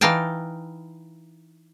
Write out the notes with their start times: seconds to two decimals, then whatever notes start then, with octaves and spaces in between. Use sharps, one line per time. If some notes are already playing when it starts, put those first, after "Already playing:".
0.01 E3 D#4 F5 G5 A5